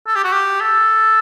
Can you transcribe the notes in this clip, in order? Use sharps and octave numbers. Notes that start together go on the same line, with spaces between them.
A4
G4
F#4
G4
A4